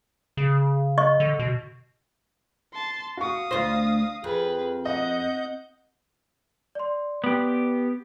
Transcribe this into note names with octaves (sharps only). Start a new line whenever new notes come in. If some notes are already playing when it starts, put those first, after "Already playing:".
C#3
D#5 C#6
D3
B2
A5 C6
F#4 F5 C#6 D#6
D2 F4 C5 A#6
F2 G#4 B4
D#5 F#5 G6
D5 C6
B3 G4